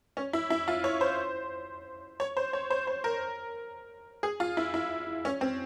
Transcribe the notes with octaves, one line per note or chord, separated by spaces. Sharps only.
C#4
E4
E4
F4
C#5
C5
C#5
C5
C#5
C5
C5
A#4
G#4
F4
E4
E4
C#4
C4